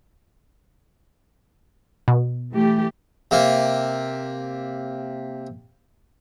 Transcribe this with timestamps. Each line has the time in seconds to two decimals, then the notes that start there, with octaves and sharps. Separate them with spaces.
2.08 B2
2.53 E3 A3 G4
3.31 C3 A#3